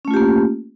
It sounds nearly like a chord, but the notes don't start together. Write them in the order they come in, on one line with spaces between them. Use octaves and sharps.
C#4 A3 F4 G4 A#3